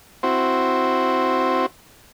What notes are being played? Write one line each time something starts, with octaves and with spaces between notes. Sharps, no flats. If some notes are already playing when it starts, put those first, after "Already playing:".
C4 E4 F#4 C5